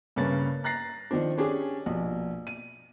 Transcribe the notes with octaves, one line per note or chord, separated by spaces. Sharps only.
G2 C#3 A#3 C#4 B4 A6
A#5 F#6 A6 A#6 C7
D#3 F3 C4 D4
C#4 D4 G4 G#4
A#1 B2
D#7